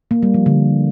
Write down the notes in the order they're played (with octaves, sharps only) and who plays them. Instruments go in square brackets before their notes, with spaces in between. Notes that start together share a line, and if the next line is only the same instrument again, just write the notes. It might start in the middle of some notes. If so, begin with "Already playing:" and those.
[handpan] A#3
G3
F3
D3